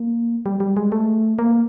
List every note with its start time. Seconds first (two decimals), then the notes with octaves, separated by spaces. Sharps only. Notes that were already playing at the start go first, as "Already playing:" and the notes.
Already playing: A#3
0.46 G3
0.60 G3
0.77 G#3
0.92 A3
1.39 A#3